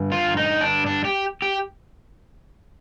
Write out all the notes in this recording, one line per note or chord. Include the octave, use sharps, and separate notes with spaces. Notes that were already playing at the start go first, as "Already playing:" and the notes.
Already playing: G2 D3
F4
D#4
D4
D4
G4
G4